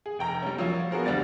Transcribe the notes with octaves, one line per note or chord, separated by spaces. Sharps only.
G#4
F1 G5 A#5
G3 C#4
F3 F#3 A#3 C#5
B3 F#4 G#4 A#4 C5
D2 G3 D5 A6 A#6